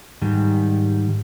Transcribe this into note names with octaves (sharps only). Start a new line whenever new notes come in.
G#2 D#3 G3